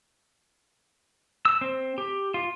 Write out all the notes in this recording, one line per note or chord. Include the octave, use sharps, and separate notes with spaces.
E6
C4
G4
F4